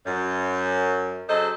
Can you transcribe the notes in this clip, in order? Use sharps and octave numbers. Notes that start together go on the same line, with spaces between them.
F#2
C#3 F#3 D#4 A4 C5 D#5